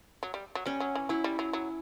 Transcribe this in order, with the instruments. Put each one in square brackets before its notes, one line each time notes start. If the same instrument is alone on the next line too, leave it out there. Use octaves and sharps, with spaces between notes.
[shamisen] F#3
G3
F#3
[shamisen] G3 [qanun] C#4
[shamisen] F#3
E3
[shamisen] F#3 [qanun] E4
[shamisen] G3
F#3
F#3